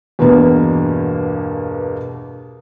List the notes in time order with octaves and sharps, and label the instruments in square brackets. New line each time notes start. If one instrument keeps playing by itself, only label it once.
[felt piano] E2 G2 B2 A#3 D4